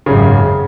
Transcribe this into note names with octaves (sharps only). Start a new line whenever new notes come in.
G#1 F#2 C#3